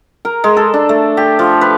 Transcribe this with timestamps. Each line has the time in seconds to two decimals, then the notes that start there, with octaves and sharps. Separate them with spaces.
0.25 A#4
0.44 G#3
0.57 A4
0.74 D4
0.89 A3
1.17 G4
1.39 F3
1.61 B4